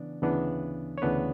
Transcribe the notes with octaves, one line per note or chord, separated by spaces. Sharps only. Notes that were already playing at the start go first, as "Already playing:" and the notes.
Already playing: C#3 E3 B3 D4 D5
D2 C#3 E3 B3 D4
C#5
D2 C#3 E3 B3 D4 B4